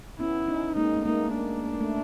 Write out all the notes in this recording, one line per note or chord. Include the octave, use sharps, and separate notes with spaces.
B3 C#4 E4
C#4 D#4
G#3 A#3 D#4
A3
G#3 A#3 D#4
D4
A3